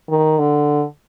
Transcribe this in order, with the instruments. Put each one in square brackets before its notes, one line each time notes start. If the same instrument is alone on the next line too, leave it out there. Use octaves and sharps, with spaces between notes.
[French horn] D#3
D3